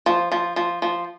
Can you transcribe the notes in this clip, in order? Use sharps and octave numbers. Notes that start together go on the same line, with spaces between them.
F3
F3
F3
F3